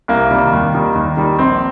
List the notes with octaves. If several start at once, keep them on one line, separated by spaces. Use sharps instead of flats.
C2 A#3
C3 D#3 G3
D#2
D#3 G3
D#2
D#3 G3
A#1 C4